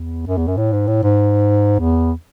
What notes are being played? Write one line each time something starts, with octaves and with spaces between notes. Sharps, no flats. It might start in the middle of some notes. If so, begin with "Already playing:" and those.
Already playing: E2
F#2
E2
F#2
A2
G#2
A2
G#2
E2